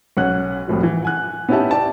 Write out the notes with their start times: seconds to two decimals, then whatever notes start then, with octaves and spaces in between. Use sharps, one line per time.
0.17 B1 C#4 F#5 F#6
0.68 C2 F2 A2 F#3
0.83 E3
1.02 F#5 G#5 F#6
1.49 B3 C#4 D#4 E4 G4 A5
1.71 D5 G5 A5